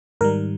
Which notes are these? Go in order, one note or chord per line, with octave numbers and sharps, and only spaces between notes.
G#2 D#3 G3 A#4